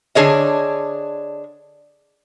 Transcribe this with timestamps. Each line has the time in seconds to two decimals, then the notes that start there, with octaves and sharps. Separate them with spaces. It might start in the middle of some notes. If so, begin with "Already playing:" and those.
0.15 D3 D4 G#4 C#5 D#5